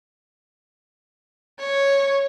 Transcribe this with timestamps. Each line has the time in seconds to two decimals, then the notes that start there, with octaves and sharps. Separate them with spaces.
1.60 C#5